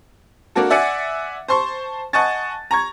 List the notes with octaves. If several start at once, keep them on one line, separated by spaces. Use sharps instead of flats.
A#3 D4 F#4 A4
D5 E5 F#5 G#5 A6 C#7
C5 A5 C6 C#6
D#5 F#5 G#5 A5 C#6 A6
A#5 C#6 G#6